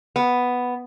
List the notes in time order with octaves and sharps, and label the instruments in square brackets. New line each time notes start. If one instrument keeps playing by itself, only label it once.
[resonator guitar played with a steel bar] B3